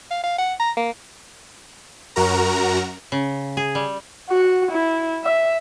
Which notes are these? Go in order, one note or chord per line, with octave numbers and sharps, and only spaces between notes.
F5
F5
F#5
A#5
A#3
F#2 F#4 A#4 A#5
C#3
G#4
G3
F#4
E4
E5